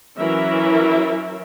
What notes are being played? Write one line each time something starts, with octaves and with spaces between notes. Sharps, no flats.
E3 F#3 C#4 E4 A#4 E5